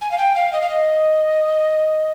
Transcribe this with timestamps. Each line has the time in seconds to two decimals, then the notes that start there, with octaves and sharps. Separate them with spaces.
0.01 G#5
0.11 F5
0.18 G5
0.35 F5
0.53 D#5
0.61 F5
0.69 D#5